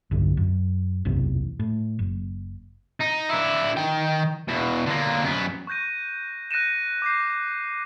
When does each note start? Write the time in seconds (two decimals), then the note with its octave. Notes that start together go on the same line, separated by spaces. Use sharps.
0.11 B1 E2 G2 D3
0.37 F#2
1.05 F#1 B1 E2 C3
1.59 A2
1.99 F#1
3.00 D#4
3.29 D3 E4
3.77 D#3 G5
4.48 E2 B2
4.87 D3 A#3
5.24 F#2 B3
5.67 C#6 F#6 G6 A#6 D#7
6.51 F#6 A#6 C#7 D#7 E7
7.02 D6 G6 C7